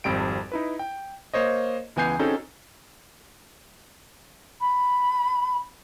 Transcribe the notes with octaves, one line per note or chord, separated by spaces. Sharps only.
G#1 F2 G3 G5 D7
D#4 E4 B4
G5
A#3 C5 C#5 D#5
C#2 E3 B3 G#5 G6 C7
C4 C#4 D#4 F#4 G#4 A4
B5